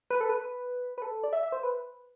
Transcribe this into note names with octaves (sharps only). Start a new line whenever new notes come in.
B4
A4
B4
B4
B4
A4
D5
E5
E5
C5
B4